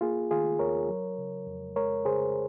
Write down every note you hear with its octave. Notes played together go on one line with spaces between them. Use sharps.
A#3 F4 G#4
D#3 F4 G#4
D#2 A#4 C#5
F#3
C#3
F2
G#3 A#4 C#5
C#3 G#4 C5